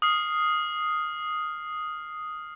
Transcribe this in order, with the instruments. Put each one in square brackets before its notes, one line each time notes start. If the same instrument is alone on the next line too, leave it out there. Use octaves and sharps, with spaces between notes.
[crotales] D#6 F6 C7